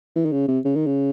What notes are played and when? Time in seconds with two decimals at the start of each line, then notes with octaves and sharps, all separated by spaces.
0.16 E3
0.25 D#3
0.32 C#3
0.48 C3
0.65 C#3
0.75 D#3
0.86 C#3